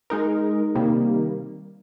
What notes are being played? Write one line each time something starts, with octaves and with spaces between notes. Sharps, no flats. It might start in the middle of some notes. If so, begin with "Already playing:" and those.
G#3 D#4 A#4
C3 D#3 G3 A#3